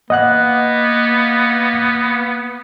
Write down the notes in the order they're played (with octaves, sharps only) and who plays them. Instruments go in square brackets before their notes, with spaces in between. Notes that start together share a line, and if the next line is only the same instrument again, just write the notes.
[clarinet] A#3 [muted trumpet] B3 [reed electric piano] D#5 F#5 F#6